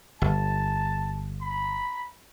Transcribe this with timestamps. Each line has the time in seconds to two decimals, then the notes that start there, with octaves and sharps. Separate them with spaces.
0.22 G1 A5
1.41 B5